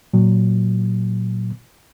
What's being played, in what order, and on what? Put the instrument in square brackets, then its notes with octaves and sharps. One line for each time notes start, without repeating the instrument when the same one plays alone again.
[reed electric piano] A#2 F#3